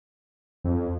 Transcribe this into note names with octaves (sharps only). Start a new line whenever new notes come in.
F2